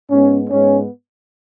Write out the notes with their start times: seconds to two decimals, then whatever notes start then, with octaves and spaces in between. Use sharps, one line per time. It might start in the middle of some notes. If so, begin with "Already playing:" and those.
0.11 G#2 G#3 B3 C#4
0.50 G#2 G#3 B3 C#4